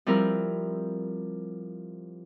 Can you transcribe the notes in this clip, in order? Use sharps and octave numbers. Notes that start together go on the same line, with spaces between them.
F3 G3 C4 E4 A#4